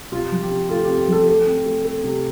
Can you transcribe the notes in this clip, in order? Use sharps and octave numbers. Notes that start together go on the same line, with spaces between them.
C3 F4
F3
G4
C3
A3 F4
G4
C4
G4
F3 A4
A3
C4
A3
A3
C3